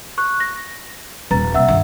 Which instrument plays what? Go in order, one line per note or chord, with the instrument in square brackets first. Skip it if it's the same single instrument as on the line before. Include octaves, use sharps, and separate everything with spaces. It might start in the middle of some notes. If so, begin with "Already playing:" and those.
[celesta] C#6 F#6
A#6
[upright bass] D#1 [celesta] B4 A#5 A6
[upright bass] C2 [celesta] E5 F#5 E6
[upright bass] G2 D#3